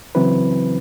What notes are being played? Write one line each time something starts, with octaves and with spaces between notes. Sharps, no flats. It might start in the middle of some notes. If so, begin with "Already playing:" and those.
C#3 E3 F#3 C4 E4 B4